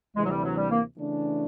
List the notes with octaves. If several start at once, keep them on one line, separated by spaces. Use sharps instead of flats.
D2 C3 E3 G#3
F#3
G3
F#3
G3
A#3
C#3 E3 A3 D4